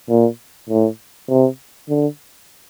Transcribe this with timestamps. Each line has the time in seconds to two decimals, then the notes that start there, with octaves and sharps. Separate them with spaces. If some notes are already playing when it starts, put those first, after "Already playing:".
0.09 A#2
0.70 A2
1.29 C3
1.89 D3